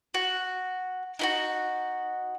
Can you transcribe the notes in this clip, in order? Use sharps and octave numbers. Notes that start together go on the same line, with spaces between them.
F#4
D#4 E4 F#4